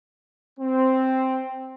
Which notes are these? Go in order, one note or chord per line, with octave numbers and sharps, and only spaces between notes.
C4